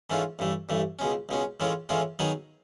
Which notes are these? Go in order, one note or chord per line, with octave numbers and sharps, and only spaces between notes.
G#2 E3 A3 C#4 F4
A1 G2 E3 A3
A1 G2 E3 A3
C#2 B2 G#3 C#4
C#2 B2 G#3 C#4
A2 E3 G#3 C#4 F4
A2 E3 G#3 C#4 F4
D#3 F#3 B3 D#4 G#4